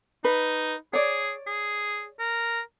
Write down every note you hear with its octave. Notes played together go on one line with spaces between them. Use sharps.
D#4 B4
G#4 C#5 D5
G#4
A#4